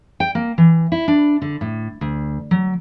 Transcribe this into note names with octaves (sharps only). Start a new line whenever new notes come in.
G5
A#3
E3
E4
D4
D3
A2
D2
F#3